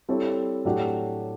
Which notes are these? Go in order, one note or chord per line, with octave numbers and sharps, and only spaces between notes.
G3 C4 E4 A4 C#5
A2 F#3 A3 D4 G4